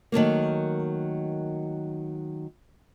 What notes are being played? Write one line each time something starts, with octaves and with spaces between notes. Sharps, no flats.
D#3 F#3 A3 A#3